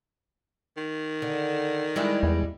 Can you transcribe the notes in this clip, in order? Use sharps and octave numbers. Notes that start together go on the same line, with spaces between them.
D#3
D3
G3 G#3 E4
E2